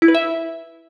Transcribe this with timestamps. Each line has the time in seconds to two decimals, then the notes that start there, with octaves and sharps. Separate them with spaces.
0.02 E4
0.08 B4
0.15 E5